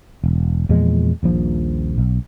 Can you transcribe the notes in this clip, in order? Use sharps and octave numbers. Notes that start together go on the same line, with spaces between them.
E1
E2 A#2 F3 G#3
D#1 A#1 F3
B1